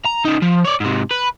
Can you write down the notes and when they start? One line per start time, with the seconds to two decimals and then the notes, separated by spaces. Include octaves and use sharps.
0.05 A#5
0.25 C#3 D#4
0.42 F3
0.65 C#5 D5
0.81 G#2 C3
1.11 B4